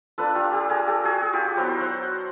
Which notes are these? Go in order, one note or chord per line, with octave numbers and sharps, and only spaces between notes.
A#3 D4 F4 A4 B4
F4 G4
G4 A4
G#4 A#4
G4 A4
F#4 G#4
F#4 G#4
F4 G4
F#4
F#3 B3 E4 A#4 C5
A#4 C5
E5 F#5